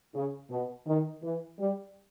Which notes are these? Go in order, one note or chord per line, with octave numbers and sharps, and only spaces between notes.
C#3
B2
D#3
E3
G3